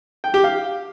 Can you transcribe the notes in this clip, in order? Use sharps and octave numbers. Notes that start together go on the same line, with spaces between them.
G5
G4
F5